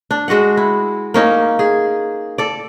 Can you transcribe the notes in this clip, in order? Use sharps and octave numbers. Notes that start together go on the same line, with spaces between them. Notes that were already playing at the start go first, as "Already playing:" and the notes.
D4
G#3 F#4 D#5 F#5
E4
A#3 C#4 D#4
G#4
A4 D5